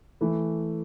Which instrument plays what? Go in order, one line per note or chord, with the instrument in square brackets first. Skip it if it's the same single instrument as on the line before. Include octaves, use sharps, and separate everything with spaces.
[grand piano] E3 A3 E4